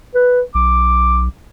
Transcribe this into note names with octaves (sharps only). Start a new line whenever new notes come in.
B4
B1 D6